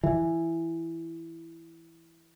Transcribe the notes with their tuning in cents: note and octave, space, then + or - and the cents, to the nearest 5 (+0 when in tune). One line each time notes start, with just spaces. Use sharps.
E3 +5